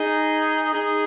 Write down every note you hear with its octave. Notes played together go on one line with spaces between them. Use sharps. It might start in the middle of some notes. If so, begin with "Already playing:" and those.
Already playing: D#4 G#4
D#4 G#4